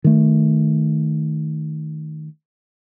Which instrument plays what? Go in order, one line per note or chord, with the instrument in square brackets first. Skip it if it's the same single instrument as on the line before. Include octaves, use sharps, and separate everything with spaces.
[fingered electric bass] D#3 A3